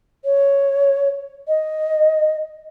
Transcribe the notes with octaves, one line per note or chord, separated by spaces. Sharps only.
C#5
D#5